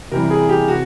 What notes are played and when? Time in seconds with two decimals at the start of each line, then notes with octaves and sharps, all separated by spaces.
0.12 C3 E3 G3 A#4
0.30 G#4
0.49 G4
0.68 C3 F#4